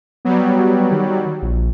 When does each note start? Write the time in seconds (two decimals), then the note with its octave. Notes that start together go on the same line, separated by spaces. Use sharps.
0.25 F#3 G3 B3
0.92 D#3
1.42 A#1